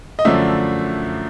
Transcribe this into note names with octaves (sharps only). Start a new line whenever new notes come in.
D#5
F#2 D3 F3 A3 D4 E5